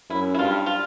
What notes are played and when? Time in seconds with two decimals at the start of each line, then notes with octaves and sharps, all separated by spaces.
0.10 F#2 E4
0.35 E4
0.38 G2 F4
0.66 F4